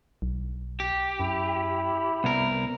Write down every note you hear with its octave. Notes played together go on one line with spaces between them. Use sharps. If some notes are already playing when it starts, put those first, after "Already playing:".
B1
G4
F#2 E4
C2 B3 A#4